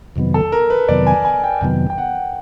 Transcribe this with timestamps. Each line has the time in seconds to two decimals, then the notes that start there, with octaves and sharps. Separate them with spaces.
0.16 F2 C3 D#3 F#3 B3
0.34 A4
0.52 A#4
0.70 B4
0.88 F2 C3 D#3 F#3 B3 D5
1.07 G#5
1.25 G#5
1.44 G5
1.61 F2 C3 D#3 F#3 B3 G5
1.90 G5
1.98 F#5